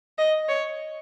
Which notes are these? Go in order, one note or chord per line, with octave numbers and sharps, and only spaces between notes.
D#5
C#5